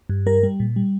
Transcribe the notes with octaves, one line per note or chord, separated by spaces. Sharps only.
G2
G3 A#4
G3
A#2
G3